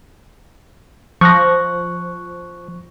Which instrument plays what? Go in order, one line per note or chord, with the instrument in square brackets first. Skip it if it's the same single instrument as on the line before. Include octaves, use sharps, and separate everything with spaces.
[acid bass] F3 [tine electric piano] C#6 F#6 A#6